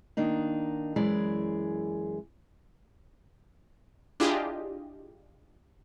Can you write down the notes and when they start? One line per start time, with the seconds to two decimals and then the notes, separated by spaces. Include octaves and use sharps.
0.17 D#3 A#3 D4 D#4
0.96 F#2 E3 G#3 E4 G#4 D5
4.20 D4 E4 F4 G4 G#4 D#5